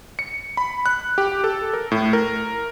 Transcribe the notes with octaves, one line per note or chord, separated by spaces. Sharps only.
C#7
B5
F#6
G4
A4
A#4
A2
A#4